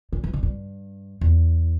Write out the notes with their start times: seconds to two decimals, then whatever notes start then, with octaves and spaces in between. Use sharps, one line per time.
0.13 D3
0.24 E3
0.33 D3
0.43 G2
1.21 E2